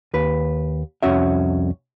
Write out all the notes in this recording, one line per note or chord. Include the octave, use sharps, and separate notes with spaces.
D#2 B4
C2 F2 C#4 F#4 E5